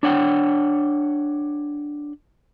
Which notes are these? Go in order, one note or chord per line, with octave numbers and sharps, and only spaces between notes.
D4 C#5 F#5 G5